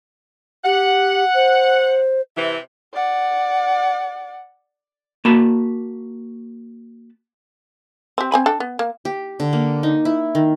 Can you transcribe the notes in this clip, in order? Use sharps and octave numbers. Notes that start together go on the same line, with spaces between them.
G4 F#5
C5
C3 E3
D5 F#5
A#3 F#4 A5 B5
C4 G4
C4 G#5 B5
D4 A4 G5
B3
A#3
G4
D3
A#3
D#4
E4
D#3